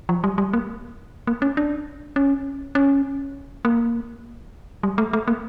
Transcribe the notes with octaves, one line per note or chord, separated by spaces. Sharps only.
F3
G3
G3
A#3
A#3
C#4
D4
C#4
C#4
A#3
G3
A3
A3
A#3